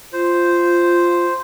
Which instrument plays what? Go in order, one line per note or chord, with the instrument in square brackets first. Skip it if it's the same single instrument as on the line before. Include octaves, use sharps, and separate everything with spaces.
[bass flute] F4 [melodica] C5